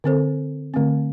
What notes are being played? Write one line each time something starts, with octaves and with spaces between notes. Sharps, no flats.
D3 C4 A4 C5
D3 A3 C4